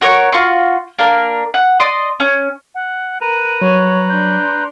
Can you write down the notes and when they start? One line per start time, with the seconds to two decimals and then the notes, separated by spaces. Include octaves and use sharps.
0.01 F#4 A#4 C#5 C#6
0.32 F4 F#4 C6 C#6
0.99 A#3 D4 A#4
1.54 F#5
1.80 D5 D#5 C6 D#6
2.20 C#4
2.75 F#5
3.21 A#4 B4 A#5 F#6 D#7
3.62 F#3 C#5
4.09 D4 C6 G6